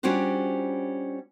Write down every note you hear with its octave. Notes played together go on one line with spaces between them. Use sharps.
G3 C#4 D4 F4 F#4 C5